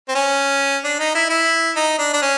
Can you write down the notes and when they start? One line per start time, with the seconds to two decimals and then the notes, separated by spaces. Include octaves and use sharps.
0.09 C4
0.15 C#4
0.84 D4
0.99 D#4
1.15 E4
1.30 E4
1.76 D#4
1.98 D4
2.13 D4
2.22 C#4